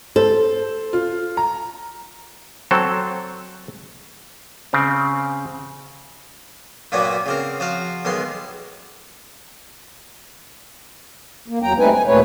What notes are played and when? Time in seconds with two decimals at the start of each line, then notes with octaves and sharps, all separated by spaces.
0.16 A4 C5
0.93 F4
1.37 A#5
2.71 F#3 C4 A4
4.73 C#3 C4
6.92 G2 A#2 F#3 G3 B3 F#4
7.26 C#3 C4 A#4
7.60 F3 F#4 F5
8.05 B1 B2 D#3 G#3 C6
11.48 A#3
11.63 E2 F#3 G5 A#5
11.79 G3 A3 C4 D#4 B4 G#5
11.94 G#5
12.07 D#2 A#2 A3 B4 C#5